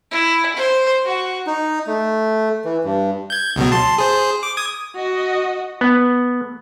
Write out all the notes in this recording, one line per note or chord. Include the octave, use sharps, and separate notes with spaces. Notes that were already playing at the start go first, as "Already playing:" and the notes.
E4
C5
F#4
D#4
A3
E3
G2
G6 G#6
C#2 B2 F#3
A5 C6
G#4 C5
D6
D#6 G#6
F#4 D#5
B3